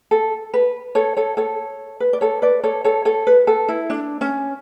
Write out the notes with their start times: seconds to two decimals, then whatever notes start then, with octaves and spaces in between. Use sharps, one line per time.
0.11 A4
0.54 B4
0.95 A4 C#5
1.17 A4 C#5
1.37 A4 C#5
2.00 B4
2.13 D5
2.21 A4 C#5
2.42 B4 D5
2.63 A4 C#5
2.84 A4 C#5
3.05 A4 C#5
3.27 B4
3.47 A4
3.68 E4
3.90 D4
4.21 C#4